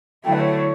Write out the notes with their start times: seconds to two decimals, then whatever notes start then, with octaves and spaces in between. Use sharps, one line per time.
0.24 D3 F#3 A3 E4 G5
0.33 B4
0.40 C#5
0.56 C#5